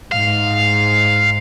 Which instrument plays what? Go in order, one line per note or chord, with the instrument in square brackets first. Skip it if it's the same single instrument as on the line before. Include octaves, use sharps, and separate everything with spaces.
[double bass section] G#2 [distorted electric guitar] F5